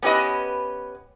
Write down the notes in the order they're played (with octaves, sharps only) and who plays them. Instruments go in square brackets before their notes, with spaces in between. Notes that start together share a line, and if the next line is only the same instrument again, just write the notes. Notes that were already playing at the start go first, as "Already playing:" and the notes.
[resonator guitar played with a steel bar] B3 C#4 G4 B4 D#5